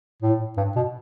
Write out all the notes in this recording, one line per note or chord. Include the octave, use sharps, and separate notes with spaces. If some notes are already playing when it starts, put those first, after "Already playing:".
A2
G2
B2